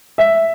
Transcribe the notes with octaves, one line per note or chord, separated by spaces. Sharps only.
E5